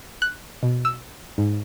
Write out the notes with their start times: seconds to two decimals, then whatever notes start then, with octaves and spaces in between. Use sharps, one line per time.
0.22 F#6
0.63 B2
0.85 E6
1.38 G#2